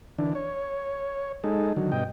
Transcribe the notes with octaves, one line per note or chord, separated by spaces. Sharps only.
D3 E3 D4
C#5
G#3 D#4 A4
D3 D#3 F#3
G2 B2 D#5 G5